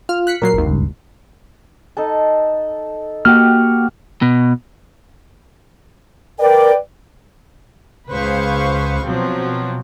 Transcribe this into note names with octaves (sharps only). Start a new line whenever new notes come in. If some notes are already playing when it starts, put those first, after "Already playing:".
F4 F6
F#6 B6 C#7
A#2 F#3 A#4 C7
G#1 D#2
C#2 G2
D#4 A4 A5
A#3 F#4 G4 F#5 F6
B2
A#4 B4 D5 G5
C#2 G#4 B4 C5 F5 C#6
B2 F3 F#3 C4